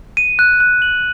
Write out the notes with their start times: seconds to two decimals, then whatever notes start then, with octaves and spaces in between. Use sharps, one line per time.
0.17 D#7
0.39 F#6
0.60 F#6
0.82 F#7